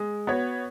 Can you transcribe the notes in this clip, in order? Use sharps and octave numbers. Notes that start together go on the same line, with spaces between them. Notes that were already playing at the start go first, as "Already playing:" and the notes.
Already playing: G#3
B3 F#4 C#5